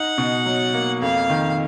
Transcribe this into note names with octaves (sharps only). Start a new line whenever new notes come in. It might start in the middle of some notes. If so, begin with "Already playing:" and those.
Already playing: D#4 F#5
B2
F#3
A#3
F2 F5
D#3